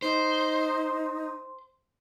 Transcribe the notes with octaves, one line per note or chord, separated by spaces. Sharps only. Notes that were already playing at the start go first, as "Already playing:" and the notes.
D#4 C5